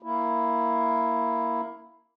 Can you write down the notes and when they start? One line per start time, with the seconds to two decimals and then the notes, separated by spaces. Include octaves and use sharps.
0.02 A#3 E4